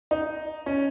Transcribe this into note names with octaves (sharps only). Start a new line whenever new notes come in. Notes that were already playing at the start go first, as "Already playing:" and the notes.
D#4
C#4